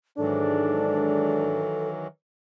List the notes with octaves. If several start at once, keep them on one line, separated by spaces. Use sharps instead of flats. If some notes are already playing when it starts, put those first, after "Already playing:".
G#2 D#3 E3 F#3 D4 A4